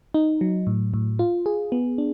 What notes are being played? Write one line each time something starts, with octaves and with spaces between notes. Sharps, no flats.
D#4
F#3
A2
A2
F4
G#4
B3
D4